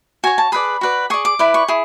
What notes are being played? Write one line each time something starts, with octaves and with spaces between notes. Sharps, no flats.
F#4 C#5 G#5
A5
G#4 B4 D5 B5
F#4 B4 D5
G#4 D5 C#6
D6
E4 B4 D5
C#6
E4 G#4